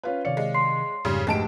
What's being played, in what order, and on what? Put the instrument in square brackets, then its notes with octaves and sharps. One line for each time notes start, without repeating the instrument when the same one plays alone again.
[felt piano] C#4 F4 B4
[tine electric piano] C3 D#3 C#7 [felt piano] C#5 D5 F5
[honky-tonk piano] G#3
[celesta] C6 C7
[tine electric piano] F2 G#2 [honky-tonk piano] C#3 G3
[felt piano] F1 D2 G4 [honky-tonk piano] G#3 A5 D7